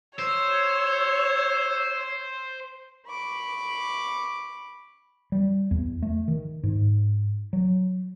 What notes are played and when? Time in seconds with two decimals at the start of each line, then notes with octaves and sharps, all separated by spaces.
0.19 C5 C#5 E6
3.09 B5 C#6 D6
5.32 G3
5.71 E2
6.02 A3
6.28 D#3
6.63 G#2
7.53 F#3